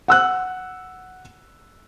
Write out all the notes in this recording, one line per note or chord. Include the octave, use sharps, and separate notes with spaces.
F#5 E6 F#6